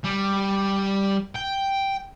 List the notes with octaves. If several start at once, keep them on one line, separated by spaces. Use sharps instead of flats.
G3
G5